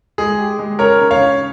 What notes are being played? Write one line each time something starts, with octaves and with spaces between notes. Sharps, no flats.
G#3 G#4
G4
G#3
C#3 A#4 C#5
C#3
C#5 F5
C#4